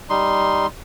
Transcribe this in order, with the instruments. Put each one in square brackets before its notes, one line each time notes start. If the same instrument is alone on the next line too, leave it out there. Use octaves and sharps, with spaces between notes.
[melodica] G3 D#4 C6